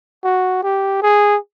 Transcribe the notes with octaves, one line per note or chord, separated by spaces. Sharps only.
F#4
G4
G#4